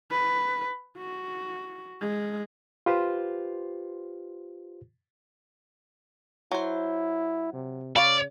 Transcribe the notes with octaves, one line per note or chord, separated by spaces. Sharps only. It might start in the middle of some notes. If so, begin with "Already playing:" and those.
B4
F#4
G#3
F4 G4 B4 C5
F#3 E4 C5
C3
C#3 C#5 D5 F5 B5